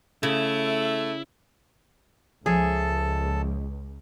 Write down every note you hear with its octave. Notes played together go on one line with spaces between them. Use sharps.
C#3 A3 E4
C#2 F3 G#4 A4 C#5 E5 A5